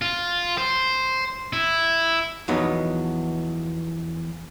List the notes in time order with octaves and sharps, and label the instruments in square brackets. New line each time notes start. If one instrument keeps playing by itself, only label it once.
[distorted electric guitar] F4
C5
E4
[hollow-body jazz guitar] E2 F3 F#3 B3 D#4